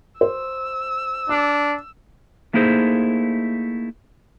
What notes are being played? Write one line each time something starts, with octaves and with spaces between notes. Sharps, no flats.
C5 E6
D4 D6
A3 A#3 D#4 E4 G#4 C5